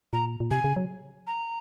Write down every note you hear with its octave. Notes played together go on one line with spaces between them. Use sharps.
A#2 A#5
A#2
C3 G#5
C#3
F#3
A#5